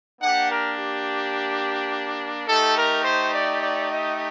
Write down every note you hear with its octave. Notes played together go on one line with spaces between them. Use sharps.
A#3 D4 G4 F#5
A#4
G4
A3 D#4 G4 A4
A#4
C5
D5
D5
D#5